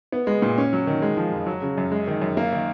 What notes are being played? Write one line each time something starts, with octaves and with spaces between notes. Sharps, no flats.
B3
G#3
A#2
C#4
F#3
D#3
G#3
F3
F2
F#3
C#3
F#2
G#3
D#3
F#2
A#3
D#3